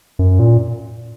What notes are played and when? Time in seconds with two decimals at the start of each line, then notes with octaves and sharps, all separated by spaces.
0.19 F#2
0.39 A#2